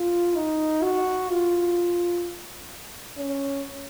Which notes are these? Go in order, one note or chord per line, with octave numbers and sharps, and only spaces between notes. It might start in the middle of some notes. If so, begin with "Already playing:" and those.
Already playing: F4
D#4
F#4
F4
C#4